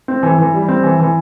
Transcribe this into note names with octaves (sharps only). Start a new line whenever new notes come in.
C4
E3
E3
G3
C4
E3
E3